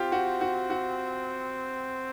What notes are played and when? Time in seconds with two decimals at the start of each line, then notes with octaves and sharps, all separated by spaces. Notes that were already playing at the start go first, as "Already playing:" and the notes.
Already playing: C4 F4 G4
0.12 F#4
0.41 F#4
0.70 F#4